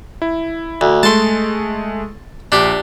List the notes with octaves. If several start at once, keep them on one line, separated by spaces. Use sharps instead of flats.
E4
D2
G#3 A3 A5 C6
A#1 D4 G4